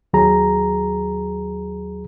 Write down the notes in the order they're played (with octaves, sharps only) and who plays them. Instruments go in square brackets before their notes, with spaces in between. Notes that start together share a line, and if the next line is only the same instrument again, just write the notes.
[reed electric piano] D#2 F#3 G#4 A#5